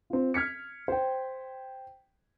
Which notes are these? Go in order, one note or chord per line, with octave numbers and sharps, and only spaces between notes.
C4 F4
F6 G#6 B6 C#7
C5 G5